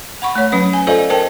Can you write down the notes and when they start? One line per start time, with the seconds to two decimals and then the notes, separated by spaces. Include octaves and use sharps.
0.22 F#5 B5 C#6
0.35 A3 C#5
0.52 F#3 C#4 B4 B5
0.73 G#5
0.87 F4 A4 C5 D5 D#5 F5
1.10 A#4 C5 D#5 G5 A5